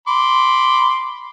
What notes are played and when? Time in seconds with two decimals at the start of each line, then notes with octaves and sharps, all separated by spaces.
0.08 B5 C6 D6